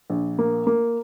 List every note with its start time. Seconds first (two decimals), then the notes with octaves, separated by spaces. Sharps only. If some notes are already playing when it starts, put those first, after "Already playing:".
0.10 A#1
0.39 A#3
0.67 A#3